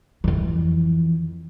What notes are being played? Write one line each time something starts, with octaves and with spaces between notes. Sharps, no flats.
F2 E3